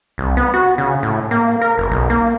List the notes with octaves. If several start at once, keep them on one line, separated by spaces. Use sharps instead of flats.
C2
B3
F#4
C#3
A2
A#3
A#4
F#1
B1
A#3